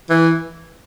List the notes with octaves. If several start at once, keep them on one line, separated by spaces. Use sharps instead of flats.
E3